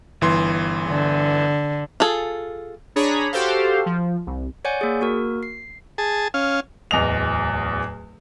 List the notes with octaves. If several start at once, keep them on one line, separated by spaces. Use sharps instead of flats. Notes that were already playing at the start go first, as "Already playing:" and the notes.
G1 E3 C6
D3
F4 G#4 A4
D4 G#4 C#5 A#5 B5
F#4 G4 A4 C5 F5
F3
C2
C#5 D5 F#5 G#5 G6
A#3 G#4
A#3 F#4 A#4
C7
G#4 A5
C#4 F5
D1 E2 D#5 F7